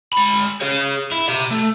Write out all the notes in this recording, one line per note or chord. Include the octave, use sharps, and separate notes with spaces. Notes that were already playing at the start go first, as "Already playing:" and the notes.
G#3 B5
G#4 C#5
E4
G4 E5
A3